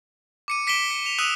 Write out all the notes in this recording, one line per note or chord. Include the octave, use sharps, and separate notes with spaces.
D6 C#7 D#7
D6 B6 D7 E7 G7
C#7
F7
D#6 E6 F#6 D#7 F7